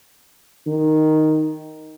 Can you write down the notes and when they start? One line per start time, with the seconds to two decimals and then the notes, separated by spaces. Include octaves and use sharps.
0.66 D#3